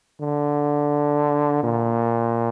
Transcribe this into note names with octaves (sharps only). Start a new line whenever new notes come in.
D3
A#2